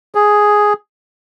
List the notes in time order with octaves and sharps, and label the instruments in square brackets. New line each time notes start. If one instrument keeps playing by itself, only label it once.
[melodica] G#4